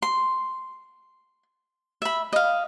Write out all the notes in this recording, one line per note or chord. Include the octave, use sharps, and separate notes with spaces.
C6
E5 B5
D#5 F5